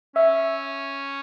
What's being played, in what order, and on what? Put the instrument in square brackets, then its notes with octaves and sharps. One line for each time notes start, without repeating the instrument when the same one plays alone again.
[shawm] C#4 [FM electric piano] E5